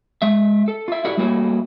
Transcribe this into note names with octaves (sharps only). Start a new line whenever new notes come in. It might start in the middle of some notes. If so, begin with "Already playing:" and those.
G#3 E5
A4
F4 E5
E4 F#4 G4 A4 D5 E5
G3 A3 A#3 F#4 A4 C#5